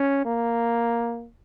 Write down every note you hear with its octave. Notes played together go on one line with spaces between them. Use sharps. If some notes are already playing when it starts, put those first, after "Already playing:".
Already playing: C#4
A#3